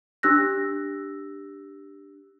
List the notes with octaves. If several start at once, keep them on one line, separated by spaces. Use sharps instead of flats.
D4 G4 E6 F#6 A#6